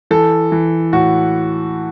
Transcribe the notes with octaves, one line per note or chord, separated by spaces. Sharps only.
E3 A4
E3
A2 F#4